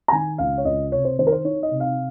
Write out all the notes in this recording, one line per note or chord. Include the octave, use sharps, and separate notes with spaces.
A#5
D#3 G#5
C#2 F5
C#5
C#2 D#5
C3 C#5
C5
D#3 C5
A#4
C5
D#4 C#5
D#5
C3
F5